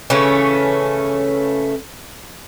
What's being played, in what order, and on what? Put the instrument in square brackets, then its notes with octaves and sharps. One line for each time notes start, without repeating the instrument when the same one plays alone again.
[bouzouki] C#3 E3 A3 C#4